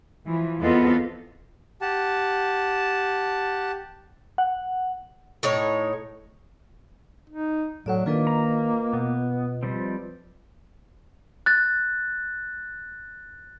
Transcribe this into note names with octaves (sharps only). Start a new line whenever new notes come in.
E3 F3
E2 B3 C4 F4 A4 D#5
G4 F#5 A5
F#5
A2 D#4 C#5
D#4
A2 F#3 A4 D5 F#5
D#3 A#3 D4 F4 B4 D#5
A#5
B2 B3
F3 G3 C4
F#6 A6